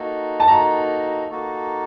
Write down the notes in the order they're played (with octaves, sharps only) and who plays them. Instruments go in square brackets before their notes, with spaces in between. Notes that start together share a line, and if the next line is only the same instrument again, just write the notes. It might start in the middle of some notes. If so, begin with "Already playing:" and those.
Already playing: [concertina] A#3 D#4 F#4 A4
[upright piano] A5
[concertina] A#3 D#4 F#4 A4 [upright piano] A#5
[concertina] A#3 D#4 F#4 A4